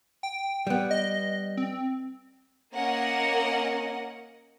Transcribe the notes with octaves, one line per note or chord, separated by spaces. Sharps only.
G5
G3 B3
D#5
C4
A#3 C#4 A#4 D#5 F#5